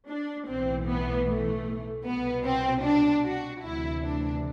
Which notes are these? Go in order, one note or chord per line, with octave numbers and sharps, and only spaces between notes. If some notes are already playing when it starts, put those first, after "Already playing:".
D4
B1 A2 E3 C4
B3
A3
C2 B2 B3
C4
D4
F#4
D2 C3 E3 E4
D4